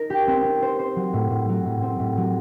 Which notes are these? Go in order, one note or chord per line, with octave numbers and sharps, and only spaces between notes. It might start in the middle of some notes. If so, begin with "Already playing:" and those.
Already playing: D#4 A#4
G4
C4
C4
C5
C5
F#3
A2
A2
F#3
A2
C4
A2
F#3